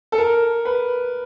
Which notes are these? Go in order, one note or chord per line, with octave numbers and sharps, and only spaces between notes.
A4
A#4
B4